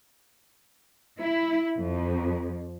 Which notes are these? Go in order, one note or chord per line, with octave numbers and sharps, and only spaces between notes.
E4
F2